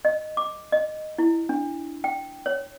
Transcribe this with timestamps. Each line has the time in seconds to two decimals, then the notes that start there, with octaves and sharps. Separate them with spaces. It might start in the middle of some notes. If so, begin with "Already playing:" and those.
0.05 D#5
0.37 D6
0.72 D#5
1.18 E4
1.49 D4
2.04 G5
2.46 C#5